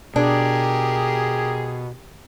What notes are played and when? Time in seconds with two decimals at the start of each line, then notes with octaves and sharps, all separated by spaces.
0.16 B2 D4 G4 G#4 A#4